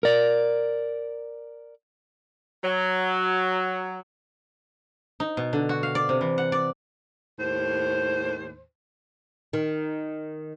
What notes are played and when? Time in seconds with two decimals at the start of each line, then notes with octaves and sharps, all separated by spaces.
0.03 A#4 D5
2.64 F#3
5.20 D#4
5.37 B2
5.53 D3
5.69 F#4
5.83 F5
5.95 D5
6.09 C3
6.21 E3
6.38 F#5
6.52 D5
7.38 D#2 A2 C5
9.53 D#3